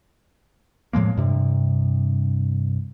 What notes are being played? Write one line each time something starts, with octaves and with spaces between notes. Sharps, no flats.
A2 F3 G#3 A#3
G2 C3